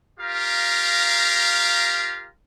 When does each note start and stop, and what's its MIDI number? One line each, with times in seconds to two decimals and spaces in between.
0.20 2.28 65
0.20 2.28 67
0.20 2.28 70
0.20 2.28 77
0.20 2.28 82